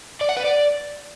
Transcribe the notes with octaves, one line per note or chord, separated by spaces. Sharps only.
D5
F#5
B4
D5